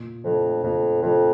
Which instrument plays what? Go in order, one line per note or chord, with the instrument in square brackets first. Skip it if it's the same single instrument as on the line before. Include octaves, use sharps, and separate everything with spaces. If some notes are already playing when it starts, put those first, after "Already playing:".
Already playing: [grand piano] A#2
[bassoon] F2 [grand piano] F3 A3 D4
[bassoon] F2 [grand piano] A#2
[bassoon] F2 [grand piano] F3 A3 D4